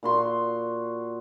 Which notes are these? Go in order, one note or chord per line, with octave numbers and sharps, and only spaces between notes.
A#2 F#4 C6